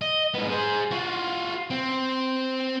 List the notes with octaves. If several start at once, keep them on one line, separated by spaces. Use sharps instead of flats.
D#5
G#2 B3
G#4 C5
F4 F#4
C4